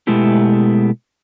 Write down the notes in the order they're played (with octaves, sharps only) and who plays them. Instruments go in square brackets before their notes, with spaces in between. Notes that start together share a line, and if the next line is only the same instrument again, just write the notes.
[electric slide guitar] B2 G#3 A3 B3 E4 G4